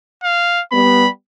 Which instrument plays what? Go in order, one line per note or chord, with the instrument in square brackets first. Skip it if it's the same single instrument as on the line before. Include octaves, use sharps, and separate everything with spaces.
[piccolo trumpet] F5
[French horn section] G3 B3 [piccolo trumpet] B5